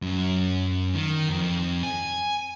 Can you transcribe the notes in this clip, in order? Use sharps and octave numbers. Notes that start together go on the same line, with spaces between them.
F#2 F#3
D#3
F2
G#5